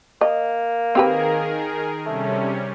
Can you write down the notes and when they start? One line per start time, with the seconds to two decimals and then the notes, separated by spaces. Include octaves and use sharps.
0.21 A#3 D#5
0.95 D#3 C4 G4 G#4 A#4 B4
2.06 C3 G3 A3 C#4